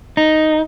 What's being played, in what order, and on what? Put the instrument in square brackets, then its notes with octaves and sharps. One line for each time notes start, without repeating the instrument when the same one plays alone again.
[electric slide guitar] D#4